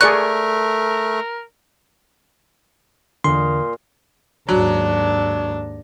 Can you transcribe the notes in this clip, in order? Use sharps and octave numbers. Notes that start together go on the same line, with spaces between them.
A3 G#4 A#4 D5 C#6 F#6
E2 A#2 D3 D#5 F5 C6
D#2 G#2 F#3 D4